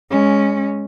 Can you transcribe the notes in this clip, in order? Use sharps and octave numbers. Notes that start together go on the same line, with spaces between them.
G#3 C#4